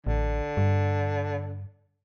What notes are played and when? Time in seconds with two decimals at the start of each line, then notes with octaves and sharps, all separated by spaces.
0.07 A1 D3
0.57 G2